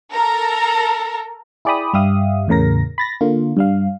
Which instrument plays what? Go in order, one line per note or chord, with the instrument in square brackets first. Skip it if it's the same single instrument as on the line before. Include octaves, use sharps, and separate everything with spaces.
[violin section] A4 A#4 A#5
[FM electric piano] E4 G#4 D5 G5 B5 D#6
G2 G3 G4 E5 F5 D#6
E2 A2 C#3 A#4 A#6
B5 A6 A#6
D3 A#3 F4
G2 G3 F5